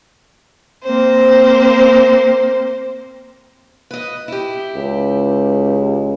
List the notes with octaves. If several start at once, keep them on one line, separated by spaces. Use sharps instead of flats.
A#3 C4 C5
B4 D#5
E4 G4
C#2